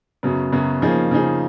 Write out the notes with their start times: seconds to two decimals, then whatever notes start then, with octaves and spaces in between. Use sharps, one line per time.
0.23 F#2 C#3 F#3 B3
0.52 F#2 C#3 F#3 B3
0.82 C#3 F3 A#3 D#4 G#4
1.11 C#3 F3 A#3 D#4 G#4